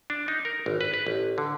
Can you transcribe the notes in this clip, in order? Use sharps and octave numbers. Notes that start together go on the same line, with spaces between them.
D4
D#4
A#4
G#1
B4
B4
A1
D3